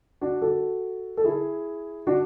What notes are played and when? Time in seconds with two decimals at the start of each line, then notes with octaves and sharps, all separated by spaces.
0.21 D4 F#4
0.42 F#4 A4
1.17 A4
1.24 E4 G#4
2.07 D4 F#4